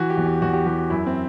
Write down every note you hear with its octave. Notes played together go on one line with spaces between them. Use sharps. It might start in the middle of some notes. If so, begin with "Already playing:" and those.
Already playing: E3 F#4
G4
E2
G4
E2 F#4
G4
E3 G4
F#4
F#2 E4
C4